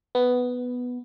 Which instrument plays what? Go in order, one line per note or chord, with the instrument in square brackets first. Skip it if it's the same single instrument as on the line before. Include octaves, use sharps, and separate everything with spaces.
[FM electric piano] B3